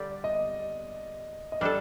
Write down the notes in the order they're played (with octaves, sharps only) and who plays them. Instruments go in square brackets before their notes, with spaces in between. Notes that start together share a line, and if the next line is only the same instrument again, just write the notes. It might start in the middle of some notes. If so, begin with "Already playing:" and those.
Already playing: [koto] D3 G3 D4 G4 [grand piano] D5
[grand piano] D#5
D#5
[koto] G3 D4 A4 [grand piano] D5